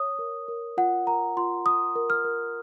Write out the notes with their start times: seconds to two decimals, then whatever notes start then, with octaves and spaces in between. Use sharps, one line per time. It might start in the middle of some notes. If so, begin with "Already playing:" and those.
Already playing: C#5 D#6
0.19 A#4
0.48 A#4
0.77 F4 F#5
1.07 A#4 A#5
1.37 F4 C6
1.66 F4 D#6
1.96 A#4
2.10 F6
2.24 A#4